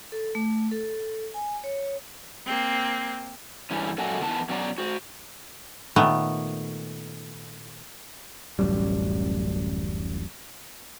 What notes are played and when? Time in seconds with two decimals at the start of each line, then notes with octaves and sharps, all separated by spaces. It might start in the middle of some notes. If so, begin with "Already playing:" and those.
0.12 A4
0.35 A3
0.71 A4
1.34 G#5
1.64 C#5
2.46 A#3 C4
3.71 G2 E3 C#4
3.98 F#2 A#2 F#4 A4 G#5
4.20 E2 D#3 E3 B3 A5
4.49 B2 F#3 C#4 D5 G#5 A#5
4.78 F#4 C5
5.96 A#2 D#3 A3 B3
8.59 D1 A1 F#2 G3